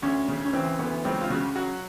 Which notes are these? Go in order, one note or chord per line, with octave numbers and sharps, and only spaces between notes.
D2 C#4
C#3
C#4
E3 C4
D2 B3
C#2 C4
F4
C#3 F#4
F#3 F#4